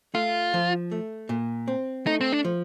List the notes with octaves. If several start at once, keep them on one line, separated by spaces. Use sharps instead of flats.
A3 F4
F3
A3
A#2
C4
A3 D#4
C4
D4
F3